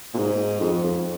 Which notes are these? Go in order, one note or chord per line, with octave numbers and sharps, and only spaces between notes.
A#2
G#2
F2
F2